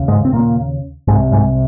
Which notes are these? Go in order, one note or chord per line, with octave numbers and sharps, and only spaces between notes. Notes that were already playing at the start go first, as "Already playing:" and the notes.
Already playing: D#2 C#3
G#2 G#3
C4
A#2 A#3
C2 G#2 C3 G#3
G#2 G#3